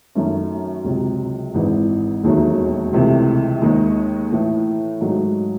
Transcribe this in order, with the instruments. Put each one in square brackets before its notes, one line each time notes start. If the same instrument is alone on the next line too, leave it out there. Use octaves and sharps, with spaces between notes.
[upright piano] F#2 D#3 F#3 A3 C#4
C#2 C3 F#3
G#1 G#2 E3
E1 D#2 D#3 F#3 A3
C#2 C3 E3 A3
D#2 D#3 G#3
A2 E3 A3
G#2 D#3 F#3 A3